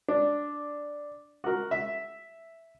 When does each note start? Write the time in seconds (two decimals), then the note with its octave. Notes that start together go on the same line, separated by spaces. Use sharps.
0.08 D4
1.44 F#4 A#4
1.71 E5